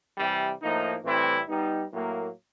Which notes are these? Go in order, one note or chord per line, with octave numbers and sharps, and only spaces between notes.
C3 E3 G3
A2 F3 A#3 D#4
A2 E3 G3 C4 E4
G3 B3 D#4
A2 F#3 A#3